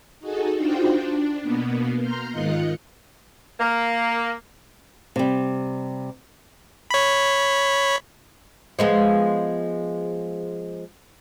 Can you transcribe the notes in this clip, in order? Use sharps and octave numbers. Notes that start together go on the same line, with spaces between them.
D#4 F#4 G#4 A4
D4 D#4 F4 F#4 C5 G5
D4
B2 A#3 B3
A#5 C6 F6 G6
G#2 D#3 F4 D#5 F#6 C#7
A#3
C3 G3
C#5 B5
F3 G#3 B3